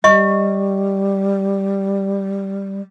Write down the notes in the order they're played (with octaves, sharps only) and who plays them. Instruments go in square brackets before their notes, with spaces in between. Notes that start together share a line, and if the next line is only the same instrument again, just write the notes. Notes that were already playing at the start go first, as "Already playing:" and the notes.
[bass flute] G3 [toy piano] D#5 C#6